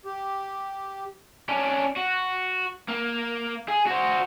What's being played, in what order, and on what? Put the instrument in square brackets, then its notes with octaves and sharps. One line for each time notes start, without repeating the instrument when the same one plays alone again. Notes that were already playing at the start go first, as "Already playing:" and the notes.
[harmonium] G4
[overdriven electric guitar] C#4 D4
F#4
A#3
G#4
F#4 C5